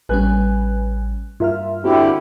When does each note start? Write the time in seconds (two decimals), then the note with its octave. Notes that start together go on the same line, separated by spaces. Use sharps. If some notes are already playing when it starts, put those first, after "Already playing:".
0.09 A1 G3 C#4 B4 G#5 F#6
1.40 G2 F4 A#4 E5 F6
1.84 D3 C4 E4 F#4 G4